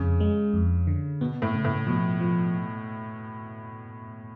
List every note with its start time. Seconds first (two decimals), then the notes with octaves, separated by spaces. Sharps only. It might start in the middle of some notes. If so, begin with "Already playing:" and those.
Already playing: F2 C#3
0.20 G#3
0.54 F2
0.87 D3
1.21 B2 B3
1.42 A2
1.54 C#3
1.65 A2
1.87 B2 F3
2.21 F3